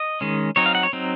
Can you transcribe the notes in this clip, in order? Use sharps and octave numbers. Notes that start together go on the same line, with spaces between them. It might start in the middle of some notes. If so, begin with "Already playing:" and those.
Already playing: D#5
D#3 G#3 C#4
F#3 C4 D#4 C#5
F5
F#5
C#5
F#3 C4 D#4